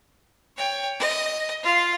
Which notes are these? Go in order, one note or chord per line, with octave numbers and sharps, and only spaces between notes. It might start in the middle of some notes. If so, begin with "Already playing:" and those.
C#5 G5
D#5
F4 F5